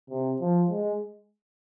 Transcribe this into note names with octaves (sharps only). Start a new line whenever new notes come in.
C3
F3
G#3